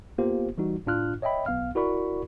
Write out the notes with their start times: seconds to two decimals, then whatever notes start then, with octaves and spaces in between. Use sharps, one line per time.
0.18 A#3 B3 F4 G4 C5
0.58 E3 G3 D#4 F#4
0.86 A2 D4 F4 F6 F#6
1.22 C#5 D#5 E5 G5 B5
1.46 B1 B3 F5 F6
1.75 E4 F#4 A#4 D5 B5 C#6